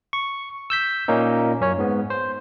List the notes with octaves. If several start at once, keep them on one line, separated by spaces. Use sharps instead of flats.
C#6
E6 G6 B6
A#2 A#3 C#4 D#4
F#2 C#4 C#5
G#2 B3
C5